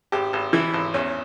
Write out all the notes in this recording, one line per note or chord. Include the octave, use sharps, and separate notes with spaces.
G#1 G4
G#1
E3 E4
G#1
E2 C#4